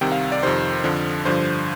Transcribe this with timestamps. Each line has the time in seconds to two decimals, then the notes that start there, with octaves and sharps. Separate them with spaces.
0.01 C2 C3 D#3 G5
0.12 F5
0.32 D5
0.43 F2 C3 D#3 C5
0.84 F2 D3 F3
1.25 G2 D3 F3 C5